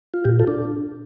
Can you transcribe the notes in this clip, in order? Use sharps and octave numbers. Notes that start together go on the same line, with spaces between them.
F4
A#2 G4
F4 A4
D4